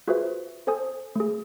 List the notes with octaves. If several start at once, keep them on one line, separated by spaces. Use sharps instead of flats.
F4 F#4 G#4 B4 C5 E5
A4 C5 G#5 D#6
A3 G#4